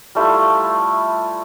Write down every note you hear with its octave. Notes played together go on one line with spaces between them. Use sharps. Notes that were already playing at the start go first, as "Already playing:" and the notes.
G3 A3 E4 F4